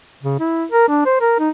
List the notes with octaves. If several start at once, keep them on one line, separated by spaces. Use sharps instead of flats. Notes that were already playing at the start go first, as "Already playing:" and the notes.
C#3
E4
A#4
D4
C5
A#4
D#4